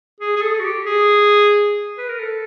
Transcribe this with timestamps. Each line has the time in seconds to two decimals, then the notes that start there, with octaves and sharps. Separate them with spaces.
0.21 G#4
0.36 G#4
0.42 A4
0.60 F#4
0.64 G4
0.86 G#4
1.98 B4
2.09 A#4
2.20 A4